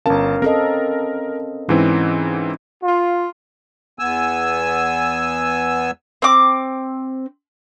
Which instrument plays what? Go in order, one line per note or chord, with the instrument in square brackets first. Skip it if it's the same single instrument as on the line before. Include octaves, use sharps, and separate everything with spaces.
[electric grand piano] G1 A5 [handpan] C#4 A#4 F5
[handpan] C4 A4 D#5 [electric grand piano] A#4
[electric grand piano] G#2 E3 C4 [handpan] C#4
[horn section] F4
[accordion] E2 B3 G#5 E6
[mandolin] C4 D6